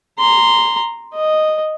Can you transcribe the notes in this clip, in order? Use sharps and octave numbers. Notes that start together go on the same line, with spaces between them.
A#5 C6
D#5